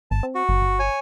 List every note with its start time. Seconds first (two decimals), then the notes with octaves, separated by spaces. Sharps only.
0.11 G#1 A5
0.23 C4
0.35 F#4
0.49 G1
0.61 G1
0.79 C#5 G#5